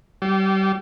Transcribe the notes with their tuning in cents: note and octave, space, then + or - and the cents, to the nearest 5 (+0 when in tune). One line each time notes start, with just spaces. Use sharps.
G3 -30